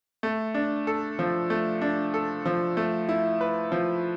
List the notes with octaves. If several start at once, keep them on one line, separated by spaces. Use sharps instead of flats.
A3
D4
A4
F3
A3
D4
A4
F3
A3
E4
B4
F3